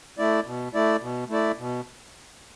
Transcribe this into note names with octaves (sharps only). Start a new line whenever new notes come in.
A3 E4 D5
B2
A3 E4 D5
B2
A3 E4 D5
B2